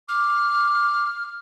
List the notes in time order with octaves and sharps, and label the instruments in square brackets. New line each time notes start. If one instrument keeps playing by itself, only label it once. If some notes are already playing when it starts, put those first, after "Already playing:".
[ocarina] D6 [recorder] F6